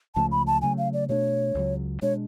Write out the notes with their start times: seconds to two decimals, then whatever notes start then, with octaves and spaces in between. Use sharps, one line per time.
0.15 C#2 C#3 F3 A3 A5
0.32 B5
0.47 A5
0.62 C#3 F#3 A3 G#5
0.78 F5
0.93 D5
1.09 B2 A3 D4 C#5
1.55 C#2 C#3 F#3
2.02 B2 G#3 D4 C#5